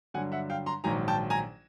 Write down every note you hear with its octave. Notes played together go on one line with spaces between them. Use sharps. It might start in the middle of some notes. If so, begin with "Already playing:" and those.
G2 D3 F#3 F#5 G#5
E5 F#5
F5 G5
A#5 C6
A#1 G#2 D#3 F#3 G#5 A#5
G5 A5
G#5 A#5